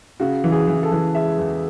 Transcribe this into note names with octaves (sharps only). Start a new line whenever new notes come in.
C#3 F#4
E3
G#4
E3
A4
E3
G#3 E5
E2